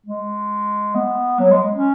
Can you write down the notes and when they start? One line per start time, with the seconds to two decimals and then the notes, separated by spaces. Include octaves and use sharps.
0.06 G#3
0.95 B3
1.40 F#3
1.51 G#3
1.74 C#4